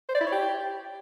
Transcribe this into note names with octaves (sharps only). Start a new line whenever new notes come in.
C5
D5
E4
C#5
G4